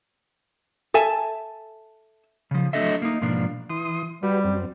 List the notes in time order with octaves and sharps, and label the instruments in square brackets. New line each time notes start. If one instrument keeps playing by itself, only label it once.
[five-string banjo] A4 E5 G#5 A5
[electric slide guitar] C#3 F3
F#3 A3 D4 A4 D#5 E5
A#3 D#4
G#2 B2 F3 A#3 D4
[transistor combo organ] E3 C6 D#6
[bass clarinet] G3 [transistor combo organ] F#4 G4 B4
[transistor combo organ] F#2 C4